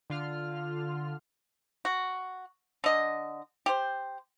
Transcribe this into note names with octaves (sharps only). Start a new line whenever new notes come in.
D3 F4 F6
F#4
D3 D#5
G4 C5